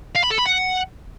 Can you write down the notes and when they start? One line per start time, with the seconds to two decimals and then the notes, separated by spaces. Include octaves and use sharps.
0.16 F5
0.24 B5
0.31 A4
0.39 B5
0.46 F#5